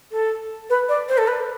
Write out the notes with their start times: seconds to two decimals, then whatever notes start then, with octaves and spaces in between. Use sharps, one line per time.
0.12 A4
0.70 B4
0.89 D5
1.08 C5
1.18 A4
1.28 B4